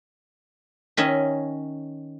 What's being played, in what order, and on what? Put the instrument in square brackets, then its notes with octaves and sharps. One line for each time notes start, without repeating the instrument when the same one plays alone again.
[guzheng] D#3 C#4 D#5 E5